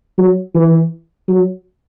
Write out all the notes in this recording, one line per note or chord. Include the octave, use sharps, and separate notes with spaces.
F#3
E3
F#3